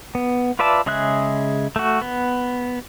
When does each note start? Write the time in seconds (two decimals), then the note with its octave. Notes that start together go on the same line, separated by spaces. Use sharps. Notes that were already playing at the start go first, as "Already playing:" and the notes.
0.15 B3
0.59 F4 B4 D5 E5 A5
0.86 C#3 G#3 G#4 E5 F#6
1.76 A3 F#4
2.02 B3